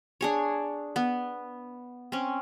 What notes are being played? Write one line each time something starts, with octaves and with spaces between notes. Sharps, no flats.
D4 G#4 C#5
B3
C4 C#4